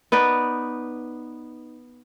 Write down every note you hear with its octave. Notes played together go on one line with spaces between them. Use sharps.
B3 D#4 B4 D5